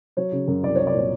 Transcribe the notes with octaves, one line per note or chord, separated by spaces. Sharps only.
F#3 C#5
C#3
F#2
C2 D5
C2 C#5
D5
A#2 C#5